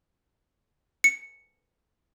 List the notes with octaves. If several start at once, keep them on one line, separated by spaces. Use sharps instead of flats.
C#7